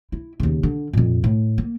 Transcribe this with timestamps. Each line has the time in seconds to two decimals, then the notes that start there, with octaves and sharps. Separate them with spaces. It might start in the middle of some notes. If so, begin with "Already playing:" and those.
0.12 E4
0.40 D#2 C#3
0.63 D3
0.93 F2 A#2
1.24 A2
1.58 A#3